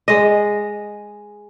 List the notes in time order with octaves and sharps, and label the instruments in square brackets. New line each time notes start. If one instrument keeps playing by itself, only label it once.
[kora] G#3 D#5